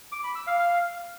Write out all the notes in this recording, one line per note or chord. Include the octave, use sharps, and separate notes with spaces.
D6
B5
E6
F5
F5